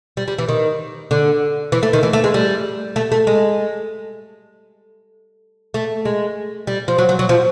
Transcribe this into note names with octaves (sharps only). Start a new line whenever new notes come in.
G3
G3
E3
D#3
D3
E3
A3
D#3
E3
A3
G#3
G3
A3
A3
G#3
A3
G#3
G3
F3
F#3
F#3
F#3
F3